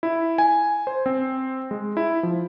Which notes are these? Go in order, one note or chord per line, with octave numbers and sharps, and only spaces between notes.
E4
G#5
C5
C4
G#3
E4
F3